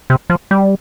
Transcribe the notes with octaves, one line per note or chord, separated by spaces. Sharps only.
C3
F3
G3